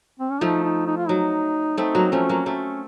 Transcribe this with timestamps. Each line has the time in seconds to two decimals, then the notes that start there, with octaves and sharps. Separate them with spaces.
0.20 C4
0.31 C#4
0.41 F3 A3 D#4
0.64 D#4
0.87 D#4
0.97 F4
1.08 F#3 D#4
1.77 A3 C4 D#4
1.95 F#3 A#3
2.12 F3 A3 C#4
2.29 F#3 A#3
2.46 A3 C4 C#4